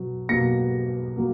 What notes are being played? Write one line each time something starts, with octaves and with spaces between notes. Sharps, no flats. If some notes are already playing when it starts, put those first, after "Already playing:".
Already playing: B2 F#3
B2 F#3 A#3 A#6 C#7
F#3 A#3